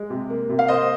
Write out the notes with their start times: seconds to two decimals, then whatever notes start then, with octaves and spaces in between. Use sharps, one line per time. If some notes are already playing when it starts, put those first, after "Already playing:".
Already playing: G#3
0.10 C3
0.30 A#3
0.49 C3
0.59 F5
0.68 A#3 C5 D#5